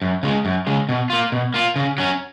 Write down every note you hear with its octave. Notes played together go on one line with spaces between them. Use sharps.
F#2
C#3 G#3
F#2
C#3 G#3
B2
A#3 F4
B2
A#3 F4
C#3
F#3 C#4